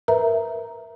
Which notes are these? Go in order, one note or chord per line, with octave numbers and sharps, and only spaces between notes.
A#4 B4 E5 A#5